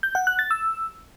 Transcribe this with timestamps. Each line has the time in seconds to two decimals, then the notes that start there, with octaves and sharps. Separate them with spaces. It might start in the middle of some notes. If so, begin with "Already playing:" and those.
0.03 G6
0.15 F#5
0.27 F#6
0.39 A6
0.51 E6